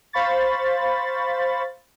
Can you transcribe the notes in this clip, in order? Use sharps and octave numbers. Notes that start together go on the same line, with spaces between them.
C5 F5 B5 C#6 A6